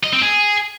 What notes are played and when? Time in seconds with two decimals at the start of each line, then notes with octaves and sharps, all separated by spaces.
0.04 D#5
0.13 C4
0.22 G#4